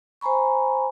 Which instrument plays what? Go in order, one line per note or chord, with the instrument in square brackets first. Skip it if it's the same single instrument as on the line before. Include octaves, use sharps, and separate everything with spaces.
[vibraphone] C5 G#5 A#5 B5 C#6